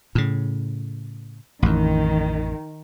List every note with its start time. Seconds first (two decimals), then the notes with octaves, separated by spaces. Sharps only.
0.15 A2 C#3
1.63 A1 F2 D#3